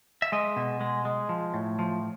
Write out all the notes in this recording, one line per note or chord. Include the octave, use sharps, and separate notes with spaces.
E5
G#3 D#5
B2
G#3
G#3
F3
A2
F3